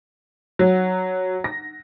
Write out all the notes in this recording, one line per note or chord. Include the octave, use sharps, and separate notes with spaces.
F#3
A#6